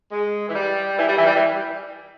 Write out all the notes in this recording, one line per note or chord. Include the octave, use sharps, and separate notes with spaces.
G#3
E3
G3
E3
G3
E3
G3
E3